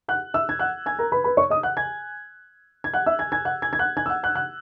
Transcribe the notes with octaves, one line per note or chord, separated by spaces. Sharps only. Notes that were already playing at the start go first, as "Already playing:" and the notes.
F#5 F#6
E5 E6
G#6
F#5 F#6
G#5 G#6
A#4 A#5
B4 B5
B4 B5
C#5 C#6
D#5 D#6
F#5 F#6
G#5 G#6
G#6
F#5 F#6
E5 E6
G#5 G#6
G#5 G#6
F#5 F#6
G#5 G#6
G#6
F#5 F#6
G#5 G#6
E6
F#5 F#6
F#5 F#6
F#5 F#6